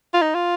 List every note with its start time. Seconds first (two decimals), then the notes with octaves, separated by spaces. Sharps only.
0.13 F4
0.22 D#4
0.35 F4